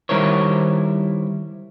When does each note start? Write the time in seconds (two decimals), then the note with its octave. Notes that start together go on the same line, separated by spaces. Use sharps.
0.09 D#3 G3 E4 A#4 C5 C#5